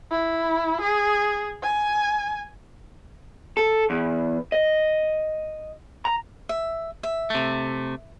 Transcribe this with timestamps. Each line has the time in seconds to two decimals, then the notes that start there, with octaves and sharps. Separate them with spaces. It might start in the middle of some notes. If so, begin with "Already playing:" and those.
0.11 E4
0.81 G#4
1.62 G#5
3.57 A4
3.90 E2
4.52 D#5
6.05 A#5
6.49 E5
7.03 E5
7.30 C3 A3